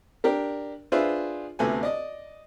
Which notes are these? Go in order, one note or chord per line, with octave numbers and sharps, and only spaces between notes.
D4 G4 A#4
D4 F4 G#4 B4 C5 E5
D2 C3 B3 A4 G#5
D5 D#5